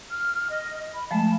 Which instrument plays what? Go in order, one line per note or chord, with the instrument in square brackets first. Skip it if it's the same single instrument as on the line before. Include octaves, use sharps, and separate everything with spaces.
[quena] F6
D#5
B5
[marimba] F3 G#3 A3 [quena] A5